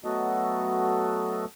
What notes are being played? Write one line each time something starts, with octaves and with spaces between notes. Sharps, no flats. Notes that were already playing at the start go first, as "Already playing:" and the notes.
F#3 A3 B3 F#4 A4 D#5